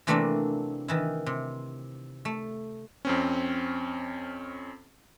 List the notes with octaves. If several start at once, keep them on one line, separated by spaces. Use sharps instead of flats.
C3 E3 A3 A#3 C4 D4
D#3 E3 E4
C3
A3
F2 C4 C#4